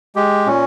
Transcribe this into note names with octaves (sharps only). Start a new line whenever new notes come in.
G#3 G4
A#2 C#4